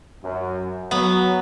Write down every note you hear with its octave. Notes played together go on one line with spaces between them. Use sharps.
F#2
F#3 B3